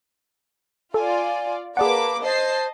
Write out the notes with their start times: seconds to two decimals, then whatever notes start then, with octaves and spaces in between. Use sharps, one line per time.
0.94 F4 A4 D5 G#5
1.77 A#3 G#4 B4 D5 F#5 A5 D6
2.23 C5 D#5 A5 C7